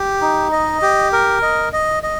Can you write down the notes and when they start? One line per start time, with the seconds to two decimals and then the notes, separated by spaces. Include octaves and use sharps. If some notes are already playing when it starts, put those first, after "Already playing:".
Already playing: G4
0.21 D#4
0.52 D#5
0.82 G4
1.12 A#4
1.42 D#5
1.73 D#5
2.03 D#5